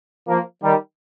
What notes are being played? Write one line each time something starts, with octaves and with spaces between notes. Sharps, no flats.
F3 A#3
D#3 G3